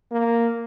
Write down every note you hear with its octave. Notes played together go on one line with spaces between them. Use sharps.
A#3